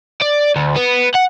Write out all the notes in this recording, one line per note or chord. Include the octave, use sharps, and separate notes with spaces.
D5
D2
B3
F#5